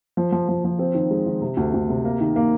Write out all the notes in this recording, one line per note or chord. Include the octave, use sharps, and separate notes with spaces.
F3
F3
F3
F3
C4
D#3
G#3
D#3
C3
D2
D2
C3
A#3
D#3
A#3